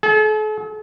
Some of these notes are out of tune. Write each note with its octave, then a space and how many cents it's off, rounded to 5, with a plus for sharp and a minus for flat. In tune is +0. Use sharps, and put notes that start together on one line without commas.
A4 -45